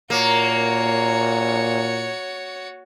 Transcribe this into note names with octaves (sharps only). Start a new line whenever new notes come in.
A#2 A#3 F#4 C#5